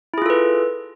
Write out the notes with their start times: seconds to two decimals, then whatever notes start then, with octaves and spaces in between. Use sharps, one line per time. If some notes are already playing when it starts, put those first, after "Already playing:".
0.14 E4
0.18 G#4
0.22 F4
0.26 A4
0.30 B4